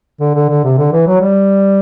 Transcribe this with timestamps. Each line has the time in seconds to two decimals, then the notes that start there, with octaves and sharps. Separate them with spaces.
0.20 D3
0.35 D3
0.49 D3
0.64 C3
0.78 D3
0.93 E3
1.07 F#3
1.21 G3